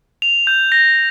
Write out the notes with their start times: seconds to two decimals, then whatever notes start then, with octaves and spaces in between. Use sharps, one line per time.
0.22 F7
0.47 G6
0.72 A#6